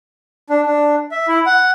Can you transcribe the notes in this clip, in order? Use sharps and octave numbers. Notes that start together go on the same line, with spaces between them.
D4
D4
E5
E4
F#5